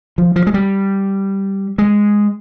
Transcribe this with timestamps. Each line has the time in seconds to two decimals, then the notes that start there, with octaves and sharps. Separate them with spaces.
0.18 F3
0.36 F3
0.47 G#3
0.54 G3
1.78 G#3